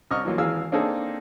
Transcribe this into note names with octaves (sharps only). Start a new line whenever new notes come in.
C2 D#5 C#6 F6
E3 F#3 A#3 F4
G#1 E3 G#4 F5 E6
A#3 C4 D4 D#4 G#4 A4